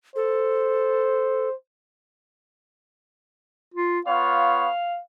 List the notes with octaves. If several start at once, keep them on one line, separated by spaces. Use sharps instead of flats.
A4 C5
F4
B3 F4 C#5 F5